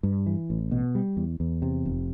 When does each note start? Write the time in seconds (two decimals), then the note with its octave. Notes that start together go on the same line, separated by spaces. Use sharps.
0.03 G2
0.26 E3
0.50 A1
0.71 B2
0.95 G3
1.17 E2
1.40 E2
1.62 C3
1.85 F1